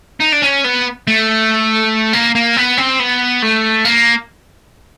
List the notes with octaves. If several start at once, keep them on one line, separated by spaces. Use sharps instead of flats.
D#4
D4
C#4
B3
A3
A#3
A#3
B3
C4
B3
A3
A#3